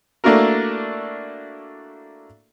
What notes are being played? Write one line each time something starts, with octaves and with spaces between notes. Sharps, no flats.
A3 A#3 D4 E4 F#4 A#4